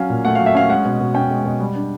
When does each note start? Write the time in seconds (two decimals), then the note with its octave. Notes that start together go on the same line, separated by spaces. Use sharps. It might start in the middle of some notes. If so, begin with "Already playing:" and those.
Already playing: F#3 C#4 F5
0.10 A#2
0.25 A3 F#5
0.35 F#3 F5
0.46 E5
0.55 C#4 F5
0.69 G#3 F#5
0.85 B2
1.00 B2
1.14 C#4 G5
1.30 G#3
1.45 B2
1.60 G3
1.75 D4